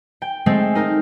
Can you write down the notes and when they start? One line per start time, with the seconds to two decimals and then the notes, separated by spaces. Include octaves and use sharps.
0.22 G5
0.46 G#3 A3 C4
0.75 D#4 A#4